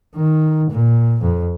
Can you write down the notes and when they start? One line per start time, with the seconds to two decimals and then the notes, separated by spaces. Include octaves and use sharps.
0.15 D#3
0.71 A#2
1.22 F2